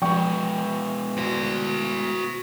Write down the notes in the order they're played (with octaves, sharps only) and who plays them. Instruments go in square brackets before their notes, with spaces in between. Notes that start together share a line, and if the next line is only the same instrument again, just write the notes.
[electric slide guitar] B2 G#3 B4 [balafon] F3 [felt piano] G5 C#6
[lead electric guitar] F#4 C5